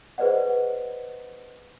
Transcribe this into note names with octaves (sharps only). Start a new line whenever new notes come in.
G#4 B4 C5 D5 D#5 F#5